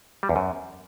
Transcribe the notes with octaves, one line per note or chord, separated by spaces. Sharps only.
G3
E2
F#2